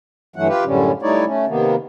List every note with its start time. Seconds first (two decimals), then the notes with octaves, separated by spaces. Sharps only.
0.36 G2 E3 F#3 A3 F#5
0.48 F4 G4 B4
0.65 F#2 A2 D3 G3 C#4
1.02 G3 A3 D#4 E4 C#5 D5
1.26 A3 C#4
1.48 C3 D#3 A#3 B3